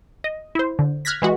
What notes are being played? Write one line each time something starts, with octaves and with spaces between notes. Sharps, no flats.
D#5
E4 C5
D3
F6 F#6 G#6 A#6 B6
E3 G#3 F#4